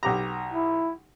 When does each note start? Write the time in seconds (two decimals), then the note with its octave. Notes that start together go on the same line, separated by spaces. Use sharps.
0.03 B1 G4 A#5
0.52 E4